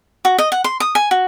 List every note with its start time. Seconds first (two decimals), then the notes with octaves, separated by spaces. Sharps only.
0.25 F#4
0.38 D#5
0.52 F#5
0.64 C6
0.80 D#6
0.95 G#5
1.11 F#4